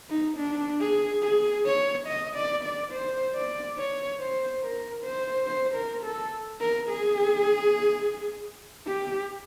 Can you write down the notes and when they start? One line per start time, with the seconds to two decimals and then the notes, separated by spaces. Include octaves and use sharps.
0.10 D#4
0.37 D4
0.80 G#4
1.22 G#4
1.66 C#5
2.07 D#5
2.35 D5
2.64 D5
2.92 C5
3.35 D5
3.78 C#5
4.20 C5
4.63 A#4
5.04 C5
5.47 C5
5.75 A#4
6.04 A4
6.60 A#4
6.89 G#4
8.87 G4